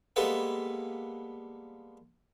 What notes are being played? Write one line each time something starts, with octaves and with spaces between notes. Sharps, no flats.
G3 G#3 A#3 B3 A4 B4